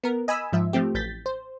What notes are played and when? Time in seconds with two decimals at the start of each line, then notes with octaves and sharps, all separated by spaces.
0.04 B3 A#4
0.28 D#5 G#5 B5 D#6 E6
0.53 G#2 F3 E5
0.73 F3 A3 C4 G4
0.95 A1 G6 A6 B6
1.26 C5